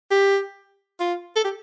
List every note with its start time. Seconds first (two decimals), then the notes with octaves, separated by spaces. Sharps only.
0.11 G4
1.00 F4
1.36 A4
1.44 G4